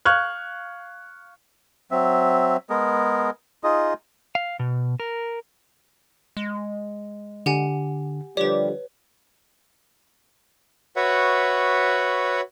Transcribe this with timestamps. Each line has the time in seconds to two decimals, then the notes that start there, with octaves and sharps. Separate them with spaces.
0.05 F5 C#6 F6 F#6 G#6
1.91 F#3 C4 E5
2.70 G#3 B3 G#4 A#4
3.64 D#4 F4 G#4 D#5
4.35 F5
4.59 B2
5.00 A#4
6.37 G#3
7.46 D3 G4 F#5 G#5
8.37 D3 F3 G3 G4 B4 C#5 D5
10.96 F#4 B4 C#5 E5 F#5